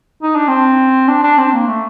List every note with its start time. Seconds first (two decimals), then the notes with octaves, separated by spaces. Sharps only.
0.23 D#4
0.36 D4
0.48 C4
1.08 D4
1.23 D4
1.38 C4
1.53 A#3
1.67 A3